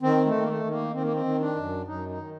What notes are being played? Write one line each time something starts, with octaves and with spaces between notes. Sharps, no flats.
D#3 C4
A3
D#3
A#3
A3
D#3
A#3
D#3 C4
A#3
C4
D#3
D4
F#2
F#2 D#4
D#4
D#3